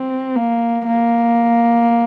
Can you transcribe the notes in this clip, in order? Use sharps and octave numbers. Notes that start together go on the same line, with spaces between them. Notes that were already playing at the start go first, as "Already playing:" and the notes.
Already playing: C4
A#3
A#3